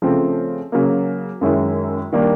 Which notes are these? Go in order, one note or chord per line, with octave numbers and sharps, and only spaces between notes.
C#3 F3 A3 C4
C#3 F#3 A#3
F#2 D#3 G#3 C#4 E4
D#3 G3 A#3 D4